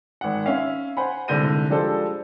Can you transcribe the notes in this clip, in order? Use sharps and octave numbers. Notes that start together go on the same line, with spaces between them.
G#1 F#5
C#4 E5 F5
C5 F#5 G#5 B5
C2 G#2 D3 G6 A#6 D#7
F3 G3 G#3 D4 A4 C5